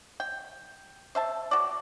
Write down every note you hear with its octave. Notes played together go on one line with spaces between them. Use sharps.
G5
C5 E5 A5
F#4 D5